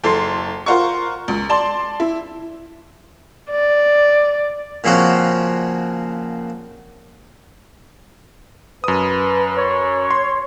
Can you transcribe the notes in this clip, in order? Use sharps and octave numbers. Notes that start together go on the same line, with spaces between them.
F#1 A4 C6 C7
F4 A#4 C5 F#5 C#6
C#2
D5 A5 C6
E4
D5
A#2 C#3 F3 C4 C#4 F#4
F#2 B4 D#6
C#5
C6